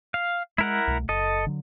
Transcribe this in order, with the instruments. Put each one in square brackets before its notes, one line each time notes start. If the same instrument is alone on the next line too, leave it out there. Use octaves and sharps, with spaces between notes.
[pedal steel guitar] F5
[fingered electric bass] G#3 [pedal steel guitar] E4 A#4 F#5
[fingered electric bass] C2 B2 A3
[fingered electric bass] F#1 [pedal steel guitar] A4 D#5
[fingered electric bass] D3 F#3